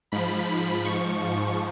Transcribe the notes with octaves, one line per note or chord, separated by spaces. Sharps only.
G#2 F3 B5
C#6